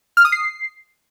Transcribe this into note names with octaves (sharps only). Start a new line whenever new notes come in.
F6
D#6
C7